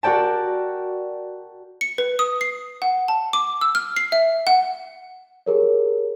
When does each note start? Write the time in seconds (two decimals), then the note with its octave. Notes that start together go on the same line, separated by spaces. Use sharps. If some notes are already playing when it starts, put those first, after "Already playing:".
0.03 F#4 A#4 D5 G5 A5
1.81 C#7
1.98 B4
2.19 D#6
2.41 C7
2.82 F#5
3.08 A5
3.33 D6
3.61 E6
3.75 F6
3.96 C7
4.12 E5
4.47 F#5
5.46 G4 G#4 A#4 C#5